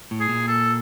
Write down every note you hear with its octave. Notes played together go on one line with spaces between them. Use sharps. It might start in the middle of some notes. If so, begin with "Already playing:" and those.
A2
G#4
A#2
A4